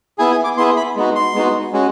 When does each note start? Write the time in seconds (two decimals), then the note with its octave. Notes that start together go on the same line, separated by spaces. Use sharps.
0.18 B3 E4 G#4 G#5
0.32 G#5
0.44 D6
0.57 B3 E4 G#4 C6
0.77 B5
0.96 G#3 B3 D#4 F#4
1.15 C6
1.35 G#3 B3 D#4 F#4
1.73 G#3 C#4 F#4